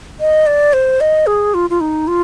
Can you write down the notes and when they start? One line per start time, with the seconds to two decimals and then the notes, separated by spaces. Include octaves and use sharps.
0.20 D#5
0.46 D5
0.73 C5
1.01 D#5
1.27 G#4
1.54 F4
1.70 F4
1.80 D#4
2.07 F4